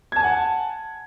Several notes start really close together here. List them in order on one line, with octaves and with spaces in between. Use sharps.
G#6 A5 G#5 F#5